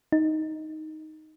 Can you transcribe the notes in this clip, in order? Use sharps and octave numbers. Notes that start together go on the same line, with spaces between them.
D#4